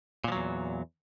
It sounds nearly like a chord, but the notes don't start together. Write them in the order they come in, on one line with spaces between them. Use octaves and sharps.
A#2 F3 F#3 E2